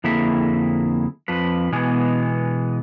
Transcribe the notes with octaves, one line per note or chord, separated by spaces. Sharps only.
F2 D3 A#3 E4 G#4 E5
F2 F3 B4
B2 E3 G#3 B3 G#4